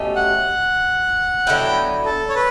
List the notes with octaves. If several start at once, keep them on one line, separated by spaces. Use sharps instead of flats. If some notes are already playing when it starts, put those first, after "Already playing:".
Already playing: B2 A3 C#4 G4
F#5
D3 F#3 B3 E4 G5
A4
C#5
B4